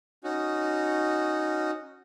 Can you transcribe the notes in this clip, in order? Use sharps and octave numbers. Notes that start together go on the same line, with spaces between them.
C#4 D#4 F#4